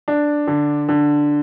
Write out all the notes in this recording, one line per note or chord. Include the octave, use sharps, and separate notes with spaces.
D4
D3
D3